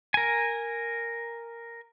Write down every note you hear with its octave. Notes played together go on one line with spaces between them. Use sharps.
A#4 G#5